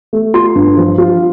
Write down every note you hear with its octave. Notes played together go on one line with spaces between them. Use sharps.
A3
F4 C6
G2
F3
F4